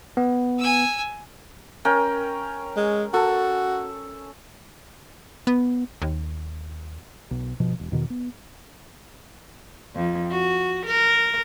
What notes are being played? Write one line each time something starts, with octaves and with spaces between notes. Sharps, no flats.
B3
G#5 E6
C#4 A#4 G5
G#3
F#4 A4
B3
D#2
B1
G1 B2 F3
E1
E2 B2 D#3
B3
F2
F#4
A#4